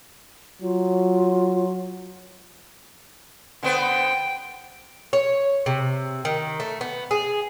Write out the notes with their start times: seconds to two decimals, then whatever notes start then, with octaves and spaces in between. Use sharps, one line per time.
0.62 F#3 F4
3.63 D3 B3 C5 G5
5.13 C#5
5.66 C3
6.25 D#3
6.60 A3
6.81 B3
7.11 G#4